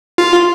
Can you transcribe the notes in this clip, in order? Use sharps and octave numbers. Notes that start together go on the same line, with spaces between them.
F4